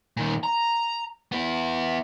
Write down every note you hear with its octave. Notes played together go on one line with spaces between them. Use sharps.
A#2 D#3
A#5
B3 E4